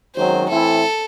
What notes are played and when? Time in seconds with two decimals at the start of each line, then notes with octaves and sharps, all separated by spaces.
0.15 G#1 F#2 D#3 F#3 C5
0.49 A2 E3 C4 E4 A4